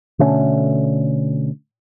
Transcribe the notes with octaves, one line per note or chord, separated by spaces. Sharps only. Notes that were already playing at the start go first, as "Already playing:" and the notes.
B2 D3 A3 C#4